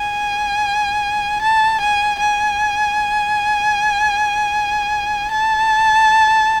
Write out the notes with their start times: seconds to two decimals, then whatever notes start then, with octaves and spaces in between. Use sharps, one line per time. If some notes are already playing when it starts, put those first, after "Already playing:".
Already playing: G#5
1.41 A5
1.80 G#5
2.19 G#5
5.31 A5